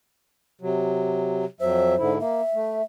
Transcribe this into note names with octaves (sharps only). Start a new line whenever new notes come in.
C3 F#3
F2 F#3 C5 E5
G#2 D3 E4
A#3 E5
A3